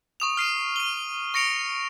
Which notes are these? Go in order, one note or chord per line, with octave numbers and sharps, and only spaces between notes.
C#6 D#6 F7
F6 C7 D#7
D#7 G7
C#6 A#6 C#7 D7 F7